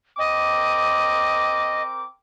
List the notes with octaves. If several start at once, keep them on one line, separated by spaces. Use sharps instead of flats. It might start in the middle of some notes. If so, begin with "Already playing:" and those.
C4 A#4 D#5 D6